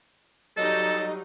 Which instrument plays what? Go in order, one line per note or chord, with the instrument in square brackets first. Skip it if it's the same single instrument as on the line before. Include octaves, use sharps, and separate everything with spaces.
[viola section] F#3 G3 D#4 [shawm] A4 [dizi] D#5